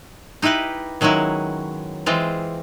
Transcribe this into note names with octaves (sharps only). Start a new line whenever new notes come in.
D#4 E4 G4 B4 D#5
D#3 F#3 G#3 C#4 E4
E3 G#3 C4 F4